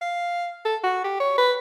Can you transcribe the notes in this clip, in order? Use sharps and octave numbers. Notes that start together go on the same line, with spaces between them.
F5
A4
F#4
G4
C#5
B4